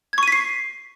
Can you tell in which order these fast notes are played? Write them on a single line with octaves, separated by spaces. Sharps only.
G#6 C#6 D#7 B6 C7